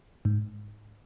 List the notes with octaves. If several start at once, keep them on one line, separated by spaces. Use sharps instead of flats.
G#2